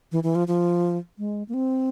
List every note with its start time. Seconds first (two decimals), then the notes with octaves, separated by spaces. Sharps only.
0.12 E3
0.23 E3
0.35 F3
0.48 F3
1.18 G#3
1.49 A#3
1.54 C4